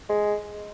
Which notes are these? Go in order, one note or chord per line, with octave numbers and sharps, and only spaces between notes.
G#3